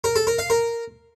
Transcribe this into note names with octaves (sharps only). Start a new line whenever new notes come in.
A#4
A4
A#4
F5
A#4